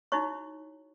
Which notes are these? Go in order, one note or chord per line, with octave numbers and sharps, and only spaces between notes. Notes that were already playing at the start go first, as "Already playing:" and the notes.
D#4 E4 F#4 C#5 C#6